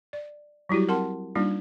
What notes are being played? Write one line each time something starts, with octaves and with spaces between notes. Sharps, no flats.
D5
F#3 G3 E4 F#4 G4
C4 A#4 F#5 A5 C6
G3 A#3 D4 D#4 F4